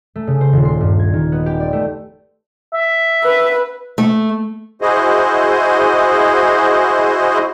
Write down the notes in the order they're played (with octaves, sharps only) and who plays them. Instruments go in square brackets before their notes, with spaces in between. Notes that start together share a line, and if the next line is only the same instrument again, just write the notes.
[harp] A3
C#3
C5
D#1
C6
G2
G#6
D#3
B3
G4
D5
A3
[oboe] E5
[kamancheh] B4
[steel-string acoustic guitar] A3
[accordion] E4 F#4 G#4 C5 D#5